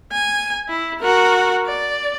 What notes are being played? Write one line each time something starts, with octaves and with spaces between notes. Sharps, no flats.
G#5
E4
F#4 A#4
D5